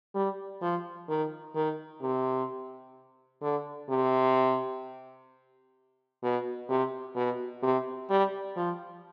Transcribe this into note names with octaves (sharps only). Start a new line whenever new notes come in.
G3
F3
D#3
D#3
C3
D3
C3
B2
C3
B2
C3
G3
F3